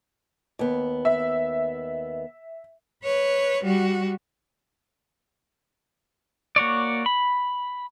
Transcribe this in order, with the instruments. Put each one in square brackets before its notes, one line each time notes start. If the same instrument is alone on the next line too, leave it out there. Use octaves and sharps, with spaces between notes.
[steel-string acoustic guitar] D#2 B3
[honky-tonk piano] E5
[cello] B4 C#5
G3 F#4
[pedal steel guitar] A#3 F#4 C#5 D5
B5